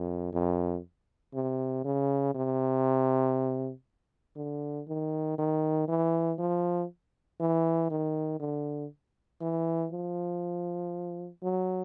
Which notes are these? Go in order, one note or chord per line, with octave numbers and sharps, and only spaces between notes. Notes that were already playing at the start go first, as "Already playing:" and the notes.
Already playing: F2
F2
C3
C#3
C3
D3
D#3
D#3
E3
F3
E3
D#3
D3
E3
F3
F#3